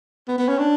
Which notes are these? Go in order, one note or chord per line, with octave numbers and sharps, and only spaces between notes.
B3
B3
C#4
D4